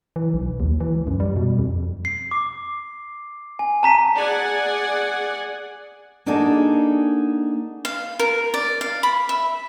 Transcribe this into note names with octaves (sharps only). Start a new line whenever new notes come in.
E3
B1
D#2
E3
C#2
F#2
G3
B2
F2
C7
D6
G#5
A5 A#5 B6 D#7
G#4 D5 F#5 G#5
A#3 D4 D#4 F#4 G#4 A4
F5
A#4
D5
F5
B5
E5